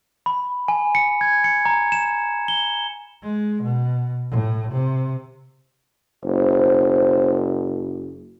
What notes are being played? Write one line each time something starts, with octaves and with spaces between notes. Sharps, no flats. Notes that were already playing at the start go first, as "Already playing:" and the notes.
B5
G#5
C#7
G#6
C#7
A#5
E7
G7
G#3
B2
A2
C3
F#1 C5